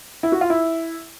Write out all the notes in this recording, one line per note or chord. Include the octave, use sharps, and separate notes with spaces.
E4
F#4
F4
E4